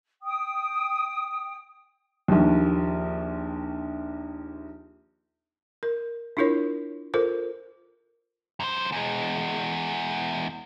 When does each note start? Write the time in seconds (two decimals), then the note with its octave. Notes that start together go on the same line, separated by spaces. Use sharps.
0.22 G5 D#6
2.28 A#1 D#2
5.83 A#4
6.37 D4 E4 F4 A#4 C#5
7.14 F4 A4 A#4 C5
8.60 F#2 C5
8.92 E2 G#3